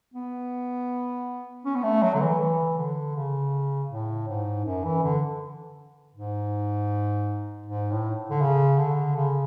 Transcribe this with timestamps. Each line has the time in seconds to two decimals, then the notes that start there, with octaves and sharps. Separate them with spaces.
0.14 B3
1.65 C#4
1.76 B3
1.83 A3
2.03 F#3
2.15 D3
2.21 E3
2.39 E3
2.77 D3
3.16 C#3
3.90 A2
4.28 G#2
4.65 F#2
4.84 E3
5.03 D3
6.15 G#2
7.66 G#2
7.91 A2
8.30 D3
8.41 C#3
8.78 D3
9.16 C#3